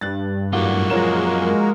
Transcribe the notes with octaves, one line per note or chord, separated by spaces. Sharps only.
G2 G3 F#6 A6
F#2 A2 A#3 F4 F#4 F#5 D6
F3 G#3 A#4 C#5 E7